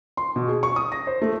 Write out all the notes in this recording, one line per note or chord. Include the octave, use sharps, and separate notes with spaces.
C6
B2
G#4
C#6
D#6
A#6
C5
A3